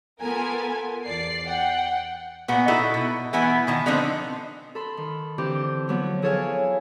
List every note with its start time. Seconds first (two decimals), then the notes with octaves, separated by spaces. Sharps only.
0.20 B3 F4 A4 A#4 G#5
1.05 E2 D5 C7
1.45 F#5 G5
2.48 A#2 B3 F#4
2.68 D#4 E4 F#4 A4
2.94 B2
3.33 E3 B3 E4 G#5
3.67 B2 D#3 A5
3.86 D3 F3 B3 C4 D4 D#4
4.75 A4 B5 C6
4.97 D#3
5.38 D3 E3 C4 G4
5.88 F3 F#3 B3
6.22 E4 G#4 A4 C#5 F5 G#5